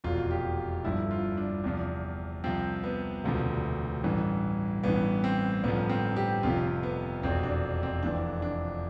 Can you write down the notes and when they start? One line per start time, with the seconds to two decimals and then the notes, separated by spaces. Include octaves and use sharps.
0.04 F1 E2 B2 F4
0.31 G4
0.84 G1 G2 F3 E4
1.11 F4
1.37 D4
1.64 E2 C3 F3
2.44 C2 C3 F3 C4
2.84 B3
3.24 E1 D2 C3 F3
4.04 A1 G2 E3
4.84 A1 G2 E3 B3
5.24 C4
5.63 A1 G2 D3 F3 B3
5.89 C4
6.16 G4
6.43 F1 F2 C3 F3 F4
6.83 B3
7.23 F1 E2 B2 C4
7.43 D4
7.83 C4
8.03 F1 F2 E3 D4
8.42 D4